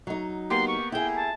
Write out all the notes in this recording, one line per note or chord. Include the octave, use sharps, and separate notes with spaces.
F#3 D#4
A#3 B3 G4 C6
C#6
E4 G#4 G5
A5